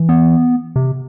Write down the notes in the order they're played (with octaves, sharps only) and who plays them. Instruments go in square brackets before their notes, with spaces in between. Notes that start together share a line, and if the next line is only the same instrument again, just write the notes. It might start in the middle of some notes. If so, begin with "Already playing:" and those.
Already playing: [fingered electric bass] E3
[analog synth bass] B3
C3